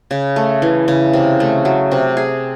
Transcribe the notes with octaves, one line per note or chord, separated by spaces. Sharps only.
C#3
A3
E3
C#3
C3
A3
F#3
C3
G#4